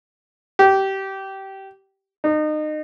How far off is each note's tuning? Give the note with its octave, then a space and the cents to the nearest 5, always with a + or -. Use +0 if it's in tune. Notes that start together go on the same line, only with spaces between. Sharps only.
G4 -20
D#4 -30